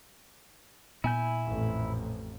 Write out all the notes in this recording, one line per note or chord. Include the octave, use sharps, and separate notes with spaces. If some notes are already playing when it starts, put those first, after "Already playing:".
A#2 B3 E4 G#5 G6
A1 F2